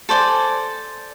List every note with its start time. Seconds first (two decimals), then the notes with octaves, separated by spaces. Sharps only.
0.09 A4 C5 D5 G#5